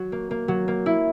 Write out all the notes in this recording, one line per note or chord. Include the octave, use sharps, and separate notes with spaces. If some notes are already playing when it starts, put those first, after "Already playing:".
Already playing: F#3 F#4
A#3
A#3
F#3
A#3
E4